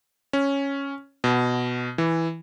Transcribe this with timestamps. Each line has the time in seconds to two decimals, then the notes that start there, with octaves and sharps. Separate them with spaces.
0.33 C#4
1.24 B2
1.98 E3